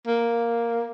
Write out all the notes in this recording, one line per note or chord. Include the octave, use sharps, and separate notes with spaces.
A#3